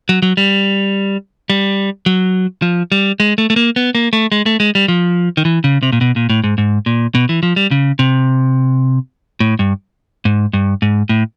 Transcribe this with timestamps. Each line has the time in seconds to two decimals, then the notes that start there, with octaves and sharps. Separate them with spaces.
0.09 F#3
0.22 F#3
0.37 G3
1.50 G3
2.06 F#3
2.62 F3
2.92 G3
3.20 G#3
3.38 A3
3.50 A3
3.56 A#3
3.76 B3
3.95 A#3
4.13 A3
4.32 G#3
4.46 A3
4.60 G#3
4.75 G3
4.88 F3
5.37 D#3
5.45 E3
5.64 C#3
5.83 C3
5.92 A#2
6.01 B2
6.16 A#2
6.29 A2
6.44 G#2
6.58 G#2
6.86 A#2
7.15 B2
7.29 E3
7.43 F3
7.56 G3
7.71 C#3
7.99 C3
9.40 A2
9.59 G2
10.25 G#2
10.53 G2
10.82 G#2
11.09 A2